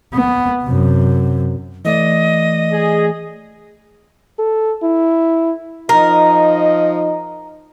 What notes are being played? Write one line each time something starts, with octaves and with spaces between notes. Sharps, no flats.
B3
F#2 C3
E3 A3 D5 D#5
G#4
A4
E4
F3 D#4 A#4 D#5